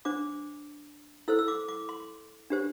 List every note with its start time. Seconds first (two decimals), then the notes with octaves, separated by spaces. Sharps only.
0.05 D4 C5 D6
1.28 E4 A4 C5 E6
1.39 E6
1.48 D6
1.68 D6
1.89 C6
2.50 D4 G4 C5